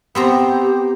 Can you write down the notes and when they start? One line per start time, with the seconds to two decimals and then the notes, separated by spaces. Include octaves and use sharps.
0.15 B3 C4 G4 A#5